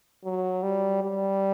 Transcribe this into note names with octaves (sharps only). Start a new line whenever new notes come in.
F#3
G3
G3